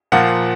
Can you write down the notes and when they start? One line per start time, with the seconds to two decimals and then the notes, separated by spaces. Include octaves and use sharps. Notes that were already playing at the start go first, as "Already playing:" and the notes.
0.12 A#2 F3 A#3 F#5